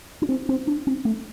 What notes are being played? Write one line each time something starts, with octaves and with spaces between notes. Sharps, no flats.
D4
C4
C4
D4
C4
A3